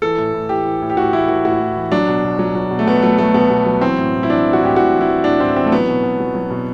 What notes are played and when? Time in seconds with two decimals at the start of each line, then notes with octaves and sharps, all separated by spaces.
0.02 E3 A4
0.17 A2
0.33 A2
0.49 E3 G4
0.65 E3
0.82 A2
0.90 G4
0.97 A2 F#4
1.13 E3 E4
1.28 E3 F#4
1.45 A2 F#4
1.60 A2
1.76 E3
1.92 F#3 D4
2.09 B2
2.24 B2
2.39 F#3
2.55 F#3
2.71 B2
2.79 A3
2.87 B2 B3
3.02 F#3 A3
3.18 F#3 A3
3.34 B2 B3
3.50 B2
3.66 F#3
3.81 E3 C4
3.98 A2
4.14 A2
4.23 E4
4.30 E3 D4
4.45 E3
4.53 F#4
4.61 A2 G4
4.76 A2 F#4
4.93 E3
5.01 E4
5.08 E3
5.24 A2 D4
5.40 A2 C4
5.56 E3 C4
5.66 A3
5.72 F#3 B3
5.88 B2
6.04 B2
6.20 F#3
6.35 F#3
6.51 B2